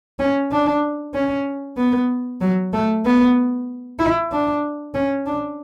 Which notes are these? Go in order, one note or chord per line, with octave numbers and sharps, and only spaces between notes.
C#4
D4
C#4
B3
F#3
A3
B3
E4
D4
C#4
D4